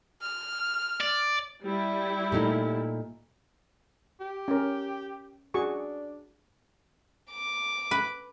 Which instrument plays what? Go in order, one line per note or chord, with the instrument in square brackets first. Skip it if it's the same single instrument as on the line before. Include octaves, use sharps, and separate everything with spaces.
[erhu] F6
[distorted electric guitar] D5
[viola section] G3 E4
[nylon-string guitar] A#2 A3 D#4
[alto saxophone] G4
[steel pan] C#4 A#4
[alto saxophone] D4 [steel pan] F#4 G#4 C#6
[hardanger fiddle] D6
[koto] B4